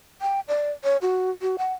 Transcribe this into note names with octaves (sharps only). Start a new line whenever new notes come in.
G5
D5
C#5
F#4
F#4
F#5